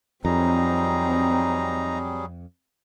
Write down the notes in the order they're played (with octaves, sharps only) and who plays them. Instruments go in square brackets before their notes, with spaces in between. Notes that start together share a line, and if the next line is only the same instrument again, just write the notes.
[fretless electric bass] F2 [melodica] F#3 G3 G#4 [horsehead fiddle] C4 [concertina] D#4 A#5